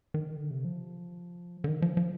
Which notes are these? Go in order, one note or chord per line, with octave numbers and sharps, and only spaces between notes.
D#3
D3
C3
F3
D3
D#3
F3
F3